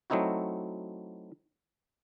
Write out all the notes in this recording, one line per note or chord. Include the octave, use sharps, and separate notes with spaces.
F#3 A3 C4 D#4 E4 F#4